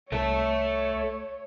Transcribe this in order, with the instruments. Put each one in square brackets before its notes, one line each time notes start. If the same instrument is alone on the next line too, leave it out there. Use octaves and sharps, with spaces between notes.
[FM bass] C2 [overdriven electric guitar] A3 A4 [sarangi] C#5